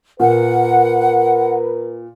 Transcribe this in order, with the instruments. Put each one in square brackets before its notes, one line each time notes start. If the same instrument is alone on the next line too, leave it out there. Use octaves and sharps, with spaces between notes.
[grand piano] A#2 [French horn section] A#4 B4 [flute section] F#5